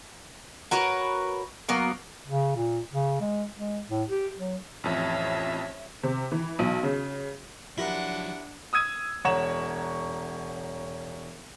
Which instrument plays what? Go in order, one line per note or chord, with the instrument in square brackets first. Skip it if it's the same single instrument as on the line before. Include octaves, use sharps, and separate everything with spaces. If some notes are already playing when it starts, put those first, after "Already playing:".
[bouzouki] F#4 A#4 B4 C#5
F#3 A#3 B3 A#4
[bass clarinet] C#3
A#2
C#3
G#3
G#3
A2
G4
F#3
[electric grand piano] A1 F2 [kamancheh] C#5 E5
[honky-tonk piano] C3
E3
B1
C#3
[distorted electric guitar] F3 F#3 [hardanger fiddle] D4 F#5 [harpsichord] E4 A#4 [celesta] G4
[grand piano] D#6 E6 G#6 D#7
E1 C#5 F#5 A#5 E7